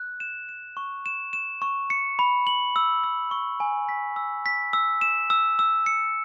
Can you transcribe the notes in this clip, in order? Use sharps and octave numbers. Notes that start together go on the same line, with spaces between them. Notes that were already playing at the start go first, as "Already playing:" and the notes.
Already playing: F#6
E7
E7
C#6
E7
E7
C#6
C#7
B5
F#7
E6
E6
C#6
G#5
B6
E6
B6
E6
E7
E6
E6
C#7